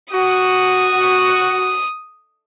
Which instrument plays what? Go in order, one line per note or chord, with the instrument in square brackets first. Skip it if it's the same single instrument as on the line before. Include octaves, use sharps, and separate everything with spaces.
[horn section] F#4 [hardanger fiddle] D#6